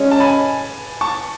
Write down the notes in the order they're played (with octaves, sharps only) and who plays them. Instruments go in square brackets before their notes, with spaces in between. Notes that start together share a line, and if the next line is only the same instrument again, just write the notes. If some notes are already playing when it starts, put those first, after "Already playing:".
Already playing: [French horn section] C#3 G#3 C#4
[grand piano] A5
G#5 B5
A5 C#6